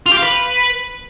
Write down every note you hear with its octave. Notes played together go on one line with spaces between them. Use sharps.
F4
G4
F5
B4